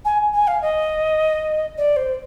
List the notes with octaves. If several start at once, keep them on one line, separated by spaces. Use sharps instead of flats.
G#5
G#5
F5
D#5
D5
C5